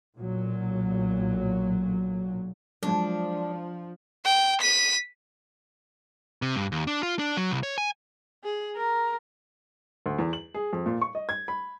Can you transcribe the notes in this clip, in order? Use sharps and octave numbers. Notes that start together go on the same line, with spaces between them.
B1 A#2 F#3
F3 F#3 G#3 D4
G5
B6 D#7
C3
G2
D#2
D4
F4
D4
F#3
C2
C#5
G#5
G#4
A#4
D2
E2
F#7
G#4
F2
A#2
C#6
D#5
G#6
B5